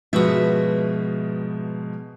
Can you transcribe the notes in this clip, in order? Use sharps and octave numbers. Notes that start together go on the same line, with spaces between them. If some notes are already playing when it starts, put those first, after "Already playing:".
G#2 B2 F3 F#4 B4 E5